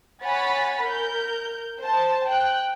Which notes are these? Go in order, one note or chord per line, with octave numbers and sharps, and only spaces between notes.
C#5 F#5 G#5 B5 A6 B6
A#4 G6
C5 A5
G5 F#6